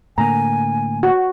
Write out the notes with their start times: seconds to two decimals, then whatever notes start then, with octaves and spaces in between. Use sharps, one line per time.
0.18 A2 D3 A#3 G#5 A#5
1.03 F#4